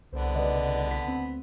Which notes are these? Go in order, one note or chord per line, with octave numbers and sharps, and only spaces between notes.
C2 D3 B3 C5 D5
C#3 B4 D5 D#5
B6
D2 C4